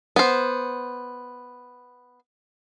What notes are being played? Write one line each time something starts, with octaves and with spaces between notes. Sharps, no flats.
B3 C5